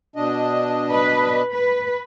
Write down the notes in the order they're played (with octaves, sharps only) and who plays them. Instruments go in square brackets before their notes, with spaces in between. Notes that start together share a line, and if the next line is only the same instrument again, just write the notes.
[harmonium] B2 D4 D#5
[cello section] B4
B4